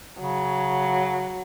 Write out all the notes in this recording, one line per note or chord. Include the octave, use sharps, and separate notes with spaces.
C#3 F#3